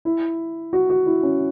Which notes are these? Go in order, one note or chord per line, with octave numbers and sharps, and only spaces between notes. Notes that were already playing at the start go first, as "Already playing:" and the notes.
E4
F#4
F#4
E4
C#4